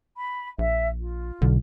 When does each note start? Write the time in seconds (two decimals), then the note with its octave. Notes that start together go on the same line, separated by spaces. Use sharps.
0.17 B5
0.59 A#1 E5
0.99 F4
1.42 B1 D3